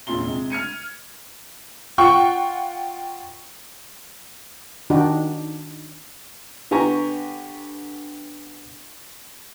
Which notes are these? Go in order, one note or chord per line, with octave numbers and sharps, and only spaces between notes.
E1 F#2 A#2 F4 C6 G7
C3 G#3
F6 G#6 C#7 D#7
F4 F#5 G5 C#6
D#3 D4 D#4 F#4 G4
D3 B3 G4 G#5 A#5 C#6